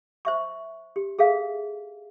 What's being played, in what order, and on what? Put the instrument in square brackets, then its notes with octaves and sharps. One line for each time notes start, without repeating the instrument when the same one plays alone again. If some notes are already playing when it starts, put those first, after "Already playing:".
[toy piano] C5 E5 C#6
G4
G#4 A4 E5 F5